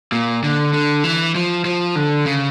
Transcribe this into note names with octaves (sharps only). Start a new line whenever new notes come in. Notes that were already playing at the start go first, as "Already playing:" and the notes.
A#2
D3
D3
E3
F3
F3
D3
C#3